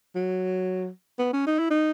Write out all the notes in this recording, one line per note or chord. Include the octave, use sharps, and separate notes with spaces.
F#3
B3
C#4
D#4
E4
D#4